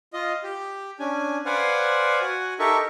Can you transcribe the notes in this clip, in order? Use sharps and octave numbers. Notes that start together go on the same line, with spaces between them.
F4 D#5
G4
C#4 D4 G#5
B4 C5 D5 F5 F#5 G#5
F#4 F#5 G#5
D#4 G4 A4 A#4 E5 C#6